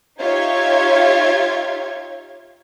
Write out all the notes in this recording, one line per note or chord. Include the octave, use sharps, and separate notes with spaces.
D#4 F4 G4 C#5 E5 G#6